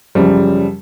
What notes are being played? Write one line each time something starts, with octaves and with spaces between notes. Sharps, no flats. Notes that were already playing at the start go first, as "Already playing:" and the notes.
F#2 C#3 F3 G3